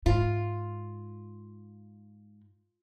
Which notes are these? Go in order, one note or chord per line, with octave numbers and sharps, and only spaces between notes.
G#2 F4